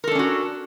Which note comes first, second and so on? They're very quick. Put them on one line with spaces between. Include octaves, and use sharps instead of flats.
A#4 A4 D4 C#4 F#4